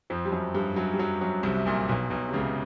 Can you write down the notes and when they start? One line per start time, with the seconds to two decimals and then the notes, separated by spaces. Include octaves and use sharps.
0.10 F2 F3
0.25 G3
0.32 F#2 F#3
0.55 G2 G3
0.76 F#2 F#3
0.94 G3
0.99 F#2 F#3
1.21 F#2 F#3
1.43 C2 C3
1.66 A#1 A#2
1.89 B1 B2
2.10 B1 B2
2.28 C3
2.33 C#2 C#3